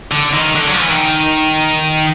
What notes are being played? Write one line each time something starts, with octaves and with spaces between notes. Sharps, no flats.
D3
D#3
D3
F#3
F3
E3
D#3